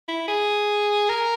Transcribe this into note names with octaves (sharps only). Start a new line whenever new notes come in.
E4
G#4
A#4